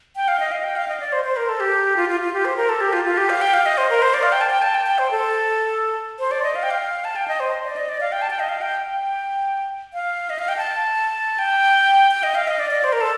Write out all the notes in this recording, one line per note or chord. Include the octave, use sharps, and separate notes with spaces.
G5
F5
D#5
F5
G5
F5
D#5
D5
C5
C5
A#4
A4
G4
F4
F4
F4
G4
C5
A#4
A4
G4
F4
F4
G4
F5
G5
F5
D#5
C5
A#4
C5
D5
F5
G5
A5
G5
A5
G5
G5
C5
A4
C5
D5
D#5
F5
G5
F5
A5
G5
D#5
C5
D5
D#5
D5
F5
G5
A5
G5
D#5
F5
G5
G5
F5
D#5
F5
G5
A5
G5
G5
D#5
F5
D#5
D5
D5
C5
A#4
A4